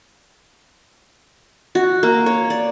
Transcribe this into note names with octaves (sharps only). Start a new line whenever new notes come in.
F#4
A#3
C#5
D5